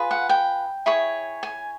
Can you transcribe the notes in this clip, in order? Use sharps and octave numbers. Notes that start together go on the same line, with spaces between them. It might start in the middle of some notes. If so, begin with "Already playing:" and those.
Already playing: F4 G#4 B4
F#5
G5
E4 G#4 C#5
G#5